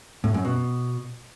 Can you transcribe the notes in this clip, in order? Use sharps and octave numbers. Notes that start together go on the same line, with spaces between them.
A2
F#2
B2